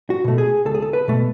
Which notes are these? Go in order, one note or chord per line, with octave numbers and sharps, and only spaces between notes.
F#4
B2 A3
G#4
C#2 A4
G#4
A4
B4
B2 A3